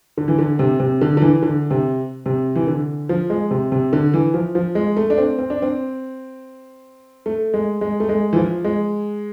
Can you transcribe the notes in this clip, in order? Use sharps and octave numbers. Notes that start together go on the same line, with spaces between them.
D3
E3
D3
C3
C3
D3
D3
E3
D3
C3
C3
E3
D3
F3
G#3
C3
C3
D3
E3
F3
F3
G#3
A3
D4
C4
C4
D4
C4
A3
G#3
G#3
A3
G#3
E3
F3
G#3